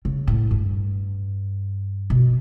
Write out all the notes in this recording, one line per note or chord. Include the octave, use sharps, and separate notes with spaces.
C#3
A2
G2
B2